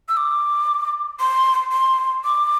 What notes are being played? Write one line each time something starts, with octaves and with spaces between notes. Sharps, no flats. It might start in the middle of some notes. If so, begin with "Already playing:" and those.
E6
D6
C6
C6
D6